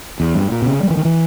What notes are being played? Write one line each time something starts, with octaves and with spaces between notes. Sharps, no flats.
E2
G2
A#2
B2
C#3
G3
E3
D#3
E3